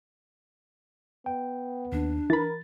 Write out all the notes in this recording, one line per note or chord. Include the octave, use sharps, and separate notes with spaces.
B3 G5
D#2 D4
E3 A#4 B5 A6